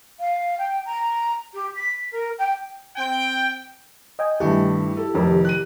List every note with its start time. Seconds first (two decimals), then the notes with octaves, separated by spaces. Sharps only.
0.19 F5
0.58 G5
0.85 A#5
1.53 G4
1.75 B6
2.11 A#4
2.38 G5
2.97 C4 G5
4.19 D#5 G5 G#5
4.40 G2 D#3 A3 E4 G4
4.97 A4
5.15 F1 F2 A#4
5.45 F#6 D#7